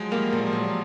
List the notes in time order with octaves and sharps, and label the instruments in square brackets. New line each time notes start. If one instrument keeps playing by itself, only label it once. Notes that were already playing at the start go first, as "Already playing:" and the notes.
Already playing: [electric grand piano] F3 F#3 G#3
[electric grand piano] G3 [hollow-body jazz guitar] A#3
[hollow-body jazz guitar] A#2 [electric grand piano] F3
[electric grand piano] F3
[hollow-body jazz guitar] A#2 [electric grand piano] F#3